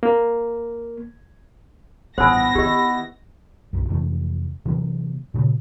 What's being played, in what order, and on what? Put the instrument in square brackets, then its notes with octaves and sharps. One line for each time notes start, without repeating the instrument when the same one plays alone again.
[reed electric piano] A#3
[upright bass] A1 G2 [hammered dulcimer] B3 E4 [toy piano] C5 G#5 [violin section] A#6
[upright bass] D#3 [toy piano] G4 D#5
[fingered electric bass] B1 F#2
F2 C3 E3 A3
C3 E3 F#3 A#3
A#2 C#3 A3